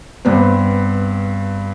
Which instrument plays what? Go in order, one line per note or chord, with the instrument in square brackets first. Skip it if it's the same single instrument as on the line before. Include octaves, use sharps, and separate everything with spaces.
[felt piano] G2 B3 C4